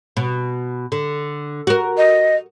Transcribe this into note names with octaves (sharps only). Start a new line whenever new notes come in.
B2
D3
F#4 A#4
D#5